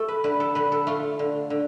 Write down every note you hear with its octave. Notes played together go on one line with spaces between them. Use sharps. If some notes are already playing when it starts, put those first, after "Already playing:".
Already playing: A3 A4
B4
D3 B4
A4
D3 B4
A4
A3 F4
D3
D3